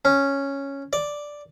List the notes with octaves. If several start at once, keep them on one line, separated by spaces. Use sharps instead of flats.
C#4
D5